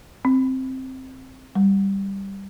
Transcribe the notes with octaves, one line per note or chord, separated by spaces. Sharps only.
C4
G3